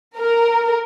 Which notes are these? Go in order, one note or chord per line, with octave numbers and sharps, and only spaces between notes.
A#4